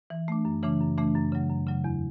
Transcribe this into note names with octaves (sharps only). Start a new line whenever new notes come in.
E3
A3 D4
F#2
C#3 E3 A3 D4
F#2
C#3 E3 A3 D4
F#2
C#3 F#3
F#2
C#3 F#3
E2